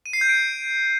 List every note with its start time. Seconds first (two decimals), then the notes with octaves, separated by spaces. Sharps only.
0.06 D#7
0.13 C7
0.21 G6
0.29 D7